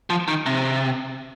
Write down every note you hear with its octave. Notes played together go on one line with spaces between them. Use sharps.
F3
D#3
C3